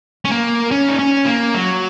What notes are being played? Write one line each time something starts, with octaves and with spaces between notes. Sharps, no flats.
C#4
A#3
C#4
D#4
C#4
A#3
F#3